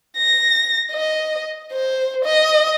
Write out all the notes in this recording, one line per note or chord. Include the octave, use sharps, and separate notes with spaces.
A#6
D#5
C5
D#5